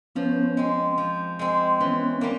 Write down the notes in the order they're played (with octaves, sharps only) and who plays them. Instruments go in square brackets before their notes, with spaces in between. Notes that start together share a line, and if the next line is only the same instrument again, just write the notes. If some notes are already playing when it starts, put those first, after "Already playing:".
[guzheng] F3 [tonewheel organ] B3 C#4
[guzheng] G#3 C4
F3
G#3 C4
[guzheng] E3 [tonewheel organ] B3 C#4
[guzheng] G3 A#3